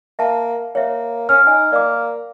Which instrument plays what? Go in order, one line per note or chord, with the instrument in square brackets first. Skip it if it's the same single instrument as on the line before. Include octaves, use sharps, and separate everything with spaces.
[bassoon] A#3 [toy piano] E5 A5
[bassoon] A#3 [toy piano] C#5 E5
[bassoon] C#4 [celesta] F6
[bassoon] D#4 [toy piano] G#5
[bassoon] A#3 [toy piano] D5 D6